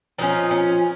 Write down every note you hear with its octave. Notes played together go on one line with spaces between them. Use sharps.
F3 A#3 C#4 D#4
C#4